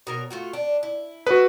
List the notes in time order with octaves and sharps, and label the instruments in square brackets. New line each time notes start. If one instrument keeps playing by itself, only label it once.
[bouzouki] B2 A#4 C#5
A3 F4 F#4
D4
E4
[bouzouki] G#3 A4 [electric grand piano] F#4 B4